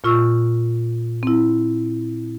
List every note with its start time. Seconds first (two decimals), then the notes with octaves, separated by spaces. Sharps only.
0.04 A#2 F4 C#6 E6
1.23 C4 E4